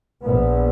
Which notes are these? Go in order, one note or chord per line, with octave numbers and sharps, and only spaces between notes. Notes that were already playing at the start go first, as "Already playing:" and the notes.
A#1 A#2 B3